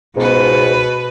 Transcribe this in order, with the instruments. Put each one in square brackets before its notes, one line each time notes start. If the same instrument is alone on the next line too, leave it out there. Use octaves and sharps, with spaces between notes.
[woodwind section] C#2 G#2 [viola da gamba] B2 B3 B4